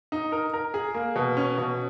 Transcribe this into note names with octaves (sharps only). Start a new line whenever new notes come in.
D#4
A#4
A#4
G#4
A#3
B2
C#4
B2